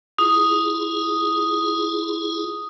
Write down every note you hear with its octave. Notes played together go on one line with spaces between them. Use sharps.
E4 F4 G#4 D#6